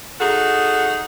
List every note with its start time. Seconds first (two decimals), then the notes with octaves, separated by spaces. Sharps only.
0.20 D#4 F#4 G#4 A4